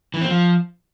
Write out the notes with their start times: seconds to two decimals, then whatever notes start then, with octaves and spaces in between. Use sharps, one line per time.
0.14 E3
0.21 C4
0.28 F3